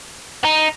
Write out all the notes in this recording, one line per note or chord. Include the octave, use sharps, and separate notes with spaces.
D#4